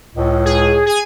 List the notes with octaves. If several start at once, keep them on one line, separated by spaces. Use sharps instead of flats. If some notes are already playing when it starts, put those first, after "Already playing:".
C#2 A2
G#4
G#4 G#5